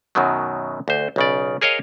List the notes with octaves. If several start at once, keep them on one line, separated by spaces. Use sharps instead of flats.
F#2 B2 D#3 F#3
D2 C5
B1 C#3 D5
G#4 A#4 C#5 D#5 F5